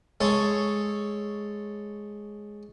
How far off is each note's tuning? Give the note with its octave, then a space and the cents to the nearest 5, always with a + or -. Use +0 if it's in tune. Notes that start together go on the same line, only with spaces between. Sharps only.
G#3 +0 A4 +0 C#5 +0